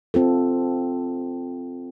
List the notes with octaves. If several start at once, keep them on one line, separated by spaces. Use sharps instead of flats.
C4 F4 A4